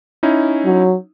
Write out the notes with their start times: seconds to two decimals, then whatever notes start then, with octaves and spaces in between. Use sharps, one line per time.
0.23 C#4 D#4 E4
0.65 F#3